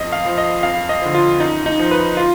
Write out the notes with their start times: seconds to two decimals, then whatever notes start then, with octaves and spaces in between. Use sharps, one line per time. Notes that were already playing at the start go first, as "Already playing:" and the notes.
Already playing: F2 D#5
0.12 F5
0.25 F3
0.38 D#5
0.63 F2 F5
0.89 D#5
1.02 D3 F3
1.15 F4
1.40 F#2 D#4
1.66 D#4
1.79 F3
1.91 B4
2.17 F4